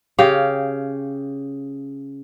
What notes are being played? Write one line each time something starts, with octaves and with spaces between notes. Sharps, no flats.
C#3 G4 F5